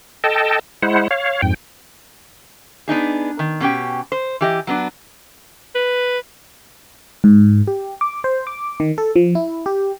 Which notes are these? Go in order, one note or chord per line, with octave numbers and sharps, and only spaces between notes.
A4 D#5 G5 A5
G#3 E4 C5 F#5
C#5 F5
F2 G#2 G5
B3 D4 D#4 G#4
D#3
B2 C#4 G4 G5
C5
E3 G4 D#5
F#3 B3 D4
B4
G#2
G4
D6
C5
D6
D#3
A4
F3
E4
G4